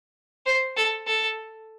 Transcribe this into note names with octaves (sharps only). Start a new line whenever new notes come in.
C5
A4
A4